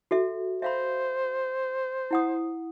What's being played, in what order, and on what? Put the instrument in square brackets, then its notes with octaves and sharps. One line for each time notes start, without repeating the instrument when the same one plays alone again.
[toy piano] F#4 A4 E5
[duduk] C5 [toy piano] E5 F5 B5
[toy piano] E4 F#5 D#6